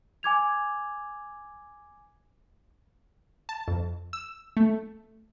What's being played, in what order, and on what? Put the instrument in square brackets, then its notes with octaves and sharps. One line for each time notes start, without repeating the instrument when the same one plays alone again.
[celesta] G#5 D6 G#6 F7
[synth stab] A5
F2
E6
A3